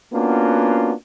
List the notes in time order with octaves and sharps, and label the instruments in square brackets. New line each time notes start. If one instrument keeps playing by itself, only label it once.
[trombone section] A#3 B3 C#4 D4 F4 F#4